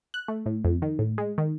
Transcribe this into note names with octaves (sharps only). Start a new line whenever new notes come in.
F#6
A3
A2
F2
D#3
A2
G#3
D#3